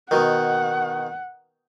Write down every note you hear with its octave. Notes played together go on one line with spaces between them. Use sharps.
B2 D#3 F#5